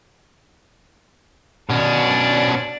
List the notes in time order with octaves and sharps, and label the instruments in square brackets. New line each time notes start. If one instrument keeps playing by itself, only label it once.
[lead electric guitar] B2 C#4 [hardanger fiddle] D4 D5